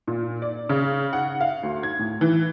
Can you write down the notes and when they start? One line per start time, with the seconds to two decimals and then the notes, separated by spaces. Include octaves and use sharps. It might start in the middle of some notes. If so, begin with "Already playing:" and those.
0.07 A#2
0.42 D5
0.69 C#3
1.13 F#5
1.41 F5
1.63 D2
1.83 G#6
1.99 A2
2.21 E3